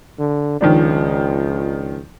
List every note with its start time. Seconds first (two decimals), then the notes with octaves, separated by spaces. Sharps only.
0.19 D3
0.61 C#2 D#3 F3 D4